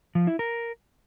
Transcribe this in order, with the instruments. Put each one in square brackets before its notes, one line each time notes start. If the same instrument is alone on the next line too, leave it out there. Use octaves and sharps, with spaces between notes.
[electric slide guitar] F3
E4
A#4